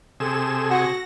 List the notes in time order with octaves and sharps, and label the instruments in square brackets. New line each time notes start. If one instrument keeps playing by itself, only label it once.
[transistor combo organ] C3 G#4 [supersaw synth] A4 E7
[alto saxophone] F#4 [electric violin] F#5 [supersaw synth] A#6